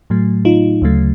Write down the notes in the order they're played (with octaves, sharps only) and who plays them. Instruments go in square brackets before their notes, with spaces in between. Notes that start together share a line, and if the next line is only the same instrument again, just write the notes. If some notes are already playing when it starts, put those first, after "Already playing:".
[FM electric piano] A2 F#3 A3
D#4 F4
D2 C#3 F#3 A3